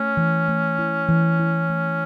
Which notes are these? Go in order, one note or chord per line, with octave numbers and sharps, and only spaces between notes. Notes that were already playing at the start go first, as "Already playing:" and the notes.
Already playing: A3 C#4
E3
A3
E4
E3
E4
A3